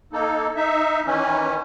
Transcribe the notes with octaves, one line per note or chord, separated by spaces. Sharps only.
A#3 D#4 A4
D#4 E5
D#3 E3 C#4